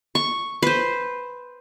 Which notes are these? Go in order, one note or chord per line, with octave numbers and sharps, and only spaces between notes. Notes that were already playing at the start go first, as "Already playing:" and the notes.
C#6
B4 C5